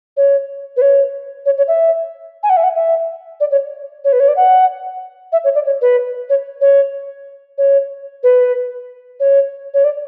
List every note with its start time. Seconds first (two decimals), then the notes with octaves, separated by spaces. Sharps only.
0.17 C#5
0.76 B4
0.81 C#5
1.46 C#5
1.57 C#5
1.68 E5
2.43 G#5
2.50 F#5
2.57 E5
2.63 F#5
2.75 E5
3.40 D5
3.51 C#5
4.04 C#5
4.12 B4
4.20 C#5
4.28 D5
4.36 F#5
5.32 E5
5.44 C#5
5.55 D5
5.66 C#5
5.81 B4
6.29 C#5
6.61 C#5
7.58 C#5
8.23 B4
9.20 C#5
9.74 C#5
9.84 D5